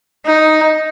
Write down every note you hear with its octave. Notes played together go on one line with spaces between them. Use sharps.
D#4